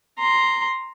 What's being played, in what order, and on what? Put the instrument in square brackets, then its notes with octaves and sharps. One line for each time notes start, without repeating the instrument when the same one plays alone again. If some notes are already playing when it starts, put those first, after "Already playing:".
[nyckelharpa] A#5 C6